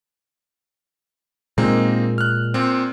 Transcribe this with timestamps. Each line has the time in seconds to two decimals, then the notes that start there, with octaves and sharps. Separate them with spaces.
1.58 A#2 G#3 A#3 C4 D#4
2.18 F6 F#6
2.54 A#2 C4